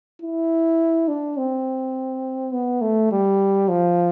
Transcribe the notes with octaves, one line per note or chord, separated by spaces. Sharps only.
E4
D4
C4
B3
A3
G3
F3